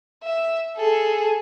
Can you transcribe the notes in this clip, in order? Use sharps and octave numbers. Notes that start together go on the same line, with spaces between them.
E5
G#4 A4